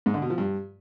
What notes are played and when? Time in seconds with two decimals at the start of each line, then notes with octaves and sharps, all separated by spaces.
0.06 G#2
0.14 D3
0.22 B2
0.30 F3
0.38 G2